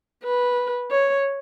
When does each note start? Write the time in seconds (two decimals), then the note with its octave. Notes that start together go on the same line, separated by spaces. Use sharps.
0.24 B4
0.91 C#5